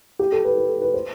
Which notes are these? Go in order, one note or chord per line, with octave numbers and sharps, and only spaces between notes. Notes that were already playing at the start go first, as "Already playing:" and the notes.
G4
A4
B4
B4
A4
B4
C5